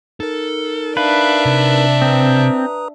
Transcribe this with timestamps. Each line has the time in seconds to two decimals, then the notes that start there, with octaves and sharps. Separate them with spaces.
0.20 D#4 A4 A#4
0.97 D4 B4 E5 F5
1.45 C3
2.02 C4 B4 A#5 D#6